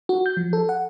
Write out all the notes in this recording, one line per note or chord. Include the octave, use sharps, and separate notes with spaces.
F#4
G6
F3
A4
F#5